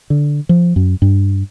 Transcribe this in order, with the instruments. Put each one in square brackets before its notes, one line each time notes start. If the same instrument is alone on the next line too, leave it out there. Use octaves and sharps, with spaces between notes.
[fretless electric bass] D3
F3
F#2
G2